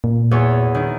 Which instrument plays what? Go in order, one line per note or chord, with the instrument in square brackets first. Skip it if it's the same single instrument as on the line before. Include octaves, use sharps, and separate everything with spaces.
[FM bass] A#2
[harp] E2 C#5
D#3